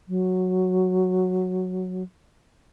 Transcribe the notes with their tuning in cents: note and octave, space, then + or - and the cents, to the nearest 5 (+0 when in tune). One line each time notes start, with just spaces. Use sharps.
F#3 -5